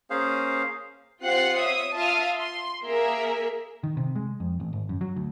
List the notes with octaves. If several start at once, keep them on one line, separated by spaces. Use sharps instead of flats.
A#3 C#4 G#4 C5 F5
C4 F4 G4 F#5 F#6 C7
C#5 E5 D#6
F4 E5 F5 A5 D#6
C6
A#3 G#4 A#4 E5
D#3
C3
G#3
F2
A1
G#1
F#2
F#3
D2